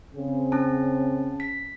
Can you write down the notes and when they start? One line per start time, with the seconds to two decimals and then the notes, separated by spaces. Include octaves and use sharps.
0.15 C#3 C4 G#4
0.52 C#4 A5
1.40 B6